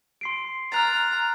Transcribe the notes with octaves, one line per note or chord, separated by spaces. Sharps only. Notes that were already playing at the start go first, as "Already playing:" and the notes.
C6 C7 D7
A#5 F6 F#6 A6